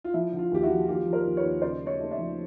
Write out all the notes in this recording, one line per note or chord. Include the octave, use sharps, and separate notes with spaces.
F4
F3 E4
D3
F4
D#2 G4
E4 F#4
F3
D#2 F4 G4
F3
A#4 C5
D#2
B4 C#5
D#2
C#3 C5 D5
A3
C#5 D#5
A3
D5 E5
F3